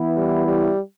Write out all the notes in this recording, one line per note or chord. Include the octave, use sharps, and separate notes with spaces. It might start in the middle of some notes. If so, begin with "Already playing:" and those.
Already playing: E3 B3 E4
G3
G3